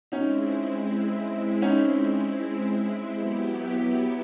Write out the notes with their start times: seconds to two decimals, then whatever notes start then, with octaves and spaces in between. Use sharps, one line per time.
0.12 G#3 C4 C#4 D#4 E4
1.62 C#4 D#4
3.13 F#3 B3 E4 G4